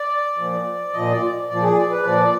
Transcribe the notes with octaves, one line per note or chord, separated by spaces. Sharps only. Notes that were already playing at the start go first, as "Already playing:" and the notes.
Already playing: D5
A#2 F3
A#2 F3 D#5
D5
A#2 F3 D5
G#4
D5
B4
A#2 F3 D5